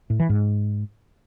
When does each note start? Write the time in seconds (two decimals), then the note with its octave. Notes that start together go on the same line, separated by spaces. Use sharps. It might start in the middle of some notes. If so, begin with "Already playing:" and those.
0.10 A2
0.20 E3
0.29 G#2